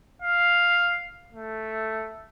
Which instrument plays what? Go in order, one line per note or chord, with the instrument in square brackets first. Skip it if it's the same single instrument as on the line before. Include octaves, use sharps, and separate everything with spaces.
[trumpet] F5
A3